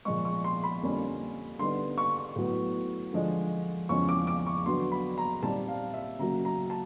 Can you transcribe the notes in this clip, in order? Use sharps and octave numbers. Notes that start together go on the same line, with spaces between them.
A#2 F3 G#3 C#6
C#6
C6
B5
F2 D3 G3 A#3 C#4
D3 G3 B3 D#4 C6
C#6
A2 F#3 B3
D3 F3 G#3
E2 C#3 F3 G#3 C#4 C#6
D6
D6
C#6
D3 F#3 B3 D4 C6
B5
A#5
A#2 G3 C4 D#4 A5
F5
E5
C#3 F#3 A#3 A#5
A#5
A5